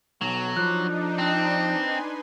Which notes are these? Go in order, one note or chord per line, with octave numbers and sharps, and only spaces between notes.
B1 F#3 A4
F3 D4 D#4 B5 D6 F#6
C4 A5 F#6
B4 G#5 C6